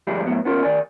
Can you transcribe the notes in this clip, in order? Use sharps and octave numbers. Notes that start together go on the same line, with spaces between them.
D2 G#2 F3 G3 G4 G#4
F#2 A2 F#3 B3
B3 C#4 F4 A#4
D#3 D5 G#5